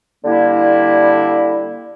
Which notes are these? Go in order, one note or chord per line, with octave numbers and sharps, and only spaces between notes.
D3 G3 A#3 E4